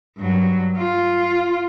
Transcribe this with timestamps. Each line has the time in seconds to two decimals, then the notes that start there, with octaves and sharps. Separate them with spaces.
0.18 G2 F#3
0.78 F4